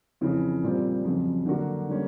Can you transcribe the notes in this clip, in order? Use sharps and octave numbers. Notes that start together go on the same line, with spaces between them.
F2 C#3 E3
A#2 G3 C4
F2 C#3 F#3
D3 F#3 A#3 D4 F#4
D3 G3 A#3 C#4